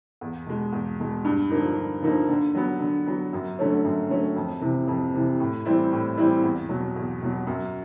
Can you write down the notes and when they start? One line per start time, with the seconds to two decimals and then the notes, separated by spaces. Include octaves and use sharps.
0.21 E2
0.46 B2 G#3
0.73 E2
0.99 B2 G#3
1.25 G2
1.50 D3 F3 A#3 D#4
1.77 G2
2.02 D3 F3 A#3 D#4
2.29 D3
2.55 F#3 B3
2.80 D3
3.06 F#3 B3
3.33 F#2
3.59 D3 F#3 A3 C#4
3.84 F#2
4.09 D3 F#3 A3 C#4
4.36 F2
4.61 C3 E3
4.88 F2
5.14 C3 E3
5.40 A2
5.65 E3 G3 C4 E4
5.92 A2
6.17 E3 G3 C4 E4
6.43 E2
6.69 B2 F#3
6.96 E2
7.22 B2 F#3
7.47 F#2